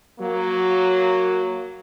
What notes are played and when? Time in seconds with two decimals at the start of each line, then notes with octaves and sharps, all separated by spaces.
0.19 F#3 A#3